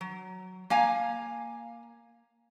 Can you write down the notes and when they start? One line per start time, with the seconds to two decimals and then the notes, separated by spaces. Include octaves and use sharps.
0.01 F#3
0.70 A#3 F5 G#5 A#5